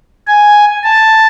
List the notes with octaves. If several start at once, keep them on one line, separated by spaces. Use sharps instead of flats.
G#5
A5